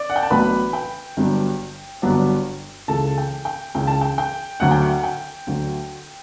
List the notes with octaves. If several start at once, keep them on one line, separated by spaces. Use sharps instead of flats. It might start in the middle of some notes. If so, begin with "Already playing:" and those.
Already playing: D5 D6
F#5
G5
A5
A1 A2 F#3 B3 D4 B4 B5
G5
G1 G2 F#3 B3 D4
G1 G2 F#3 B3 D4
C#2 C#3 E3 A4 A5
G5
G5
C#2 C#3 E3 G5
A5
G5
G5
D2 D3 F#3 F#5
G5
F#5
G5
D2 D3 F#3